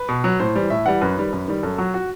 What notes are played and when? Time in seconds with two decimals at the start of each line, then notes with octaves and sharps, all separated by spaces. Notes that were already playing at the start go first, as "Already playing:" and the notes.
Already playing: B4
0.09 B2
0.24 F#3
0.40 A2 C5
0.55 E3 G3
0.70 A2 E5
0.86 E3 G3 F#5
1.01 F#2 B4
1.17 D#3 G3
1.32 F#2
1.48 D#3 G3
1.63 F#2 A4
1.78 F#3 F#4
1.94 F#4